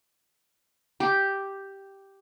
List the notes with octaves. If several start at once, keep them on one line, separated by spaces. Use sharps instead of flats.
G4